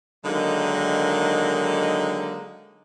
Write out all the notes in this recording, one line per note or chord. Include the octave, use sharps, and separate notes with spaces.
D3 D#3 F#3 G#3 A#3 D#4